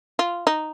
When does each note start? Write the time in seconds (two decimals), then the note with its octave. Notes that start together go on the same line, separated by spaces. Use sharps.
0.19 F4
0.47 D#4